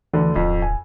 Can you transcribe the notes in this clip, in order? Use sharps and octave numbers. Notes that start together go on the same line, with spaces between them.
D2 D3 E3
D1 F2
G#5